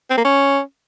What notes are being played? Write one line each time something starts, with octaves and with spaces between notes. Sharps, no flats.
C4
A#3
C#4